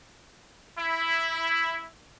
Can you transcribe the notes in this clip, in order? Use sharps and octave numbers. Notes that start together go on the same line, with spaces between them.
E4